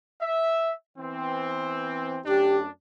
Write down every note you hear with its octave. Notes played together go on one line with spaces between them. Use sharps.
E5
E3 B3 C4
F#2 A3 D4 G4